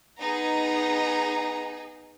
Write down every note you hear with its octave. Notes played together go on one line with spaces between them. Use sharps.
B3 D#4 G#4 A#5